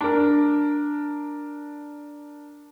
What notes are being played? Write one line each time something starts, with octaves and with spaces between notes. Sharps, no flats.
D4 A#4